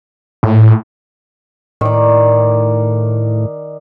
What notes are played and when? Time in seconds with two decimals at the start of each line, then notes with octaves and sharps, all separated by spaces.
0.43 A2
1.81 A2 D#3 D5